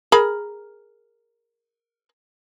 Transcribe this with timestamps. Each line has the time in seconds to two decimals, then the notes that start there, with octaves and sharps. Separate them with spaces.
0.12 G#4 A#4 B5